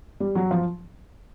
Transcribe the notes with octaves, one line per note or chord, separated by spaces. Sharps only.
G3
F#3
F3